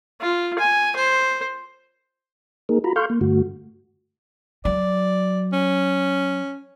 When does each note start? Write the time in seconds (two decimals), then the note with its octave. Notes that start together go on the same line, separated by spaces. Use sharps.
0.21 F4
0.59 G#5
0.96 C5
2.69 A#3 D#4 G#4 A#4
2.84 F4 F#4 A#5 B5
2.96 A4 F5 C6 C#6 F6 G6
3.10 A#3
3.21 G2 D3 A3 F#4
4.65 F#3 D5
5.53 C#4